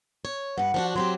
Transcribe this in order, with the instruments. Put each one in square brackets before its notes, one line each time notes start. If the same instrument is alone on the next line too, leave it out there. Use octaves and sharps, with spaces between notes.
[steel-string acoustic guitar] C#5
[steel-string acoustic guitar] G2 B4 [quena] F#5
[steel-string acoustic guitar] F3 D4 F#4
[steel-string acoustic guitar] F#3 C4 G4 [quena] C6